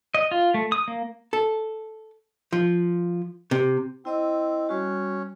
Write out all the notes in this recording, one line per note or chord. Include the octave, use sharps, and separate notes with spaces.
D#5
F4
A3
D#6
A#3
A4
F3
C3
C4 E4 D#5 E6
G3 C#4 F#4